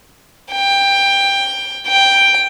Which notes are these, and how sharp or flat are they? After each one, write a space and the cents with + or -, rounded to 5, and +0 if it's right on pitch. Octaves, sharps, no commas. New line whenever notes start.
G5 +15
G5 +5